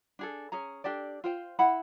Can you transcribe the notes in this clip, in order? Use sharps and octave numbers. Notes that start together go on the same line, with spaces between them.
D4 G#4 A4
C#4 G#4 A#5
D4 G4 A4 D5
F4 C5 G5
E4 F#5 B5